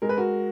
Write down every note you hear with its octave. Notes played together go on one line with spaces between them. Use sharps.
G#3 A#4
B4
F#4 A#4